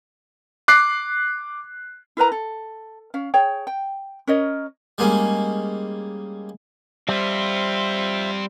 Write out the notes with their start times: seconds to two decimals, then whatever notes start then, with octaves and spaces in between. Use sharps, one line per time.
0.68 D6 F#6 C7
2.17 E4 A#4 B4 A#5
2.32 A4
3.14 C#4 F5
3.34 G#4 C#5 G5
3.67 G5
4.27 C#4 A#4 C#5 D#5
4.98 G3 G#3 A#3 C#4
7.09 G3 C4 F4 C5 E5